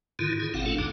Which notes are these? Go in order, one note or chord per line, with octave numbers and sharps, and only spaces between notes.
G#2 D3 D#3 E4 F4
E4 G#4
G1 A#2 C4 F5 F#5
A3 C#4 D4 F4 A4
D2 G2 D3 D#4